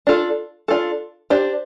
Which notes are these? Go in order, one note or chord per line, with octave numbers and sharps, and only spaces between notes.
D4 F4 A4
D4 F4 A4
D4 G4 C5